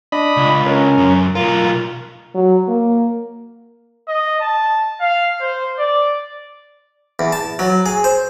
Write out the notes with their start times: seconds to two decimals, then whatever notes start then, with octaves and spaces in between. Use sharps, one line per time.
0.12 D4 D#5 B5
0.37 C#2
0.66 C#4 A#4
0.98 F#2
1.35 B1 F4 A#4
2.34 F#3
2.68 A#3
4.08 D#5
4.40 A5
5.01 F5
5.41 C5
5.79 D5
7.19 E2
7.32 A5
7.59 F#3
7.86 G#4
8.04 C5